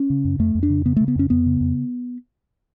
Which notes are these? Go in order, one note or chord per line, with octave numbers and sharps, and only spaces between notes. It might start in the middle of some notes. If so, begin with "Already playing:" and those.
Already playing: C#4
C#3
F#2
F2 A3
F2
D4
C#3
C#3 B3
C#3 A3
B3
F2 C#4
F2 B3
C#3
F2